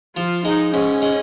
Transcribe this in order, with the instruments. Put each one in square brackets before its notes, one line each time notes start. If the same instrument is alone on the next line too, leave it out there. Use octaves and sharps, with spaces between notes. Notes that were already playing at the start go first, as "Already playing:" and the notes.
[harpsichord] F3 [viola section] F4
[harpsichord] G#3 [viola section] D#4
[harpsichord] G#2 [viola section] C#4
[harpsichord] G#3